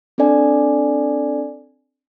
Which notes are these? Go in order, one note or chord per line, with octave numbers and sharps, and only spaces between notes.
C4 D4 A4 D5 G#5